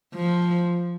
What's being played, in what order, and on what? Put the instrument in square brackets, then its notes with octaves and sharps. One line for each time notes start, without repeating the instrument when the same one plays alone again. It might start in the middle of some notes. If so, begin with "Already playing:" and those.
[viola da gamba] F3